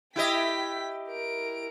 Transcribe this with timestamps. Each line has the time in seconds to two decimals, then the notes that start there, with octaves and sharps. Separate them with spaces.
0.16 E4 G4 D#5 G5 B6
1.09 A#4 D7